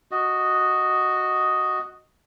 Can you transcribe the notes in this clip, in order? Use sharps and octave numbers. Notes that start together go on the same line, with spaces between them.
F#4 D#5